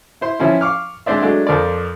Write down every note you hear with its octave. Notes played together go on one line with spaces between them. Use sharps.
E4 C5 C6
E3 F3 C#4 E4
F5 C#6 D6 F6
G#3 C4 D4 C5 D5 E5
F#3 G#3 A3 D4
F2 F3 A#4 D5